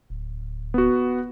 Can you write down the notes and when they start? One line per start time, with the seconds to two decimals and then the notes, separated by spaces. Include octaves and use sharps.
0.10 D1
0.74 B3 F#4